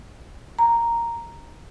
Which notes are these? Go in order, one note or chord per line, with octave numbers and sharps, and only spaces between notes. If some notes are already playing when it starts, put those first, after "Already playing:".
A#5